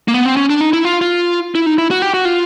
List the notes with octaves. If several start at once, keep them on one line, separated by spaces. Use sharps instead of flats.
A#3
B3
C4
C#4
D4
D#4
E4
F4
F4
E4
D#4
E4
F#4
G4
F#4
F4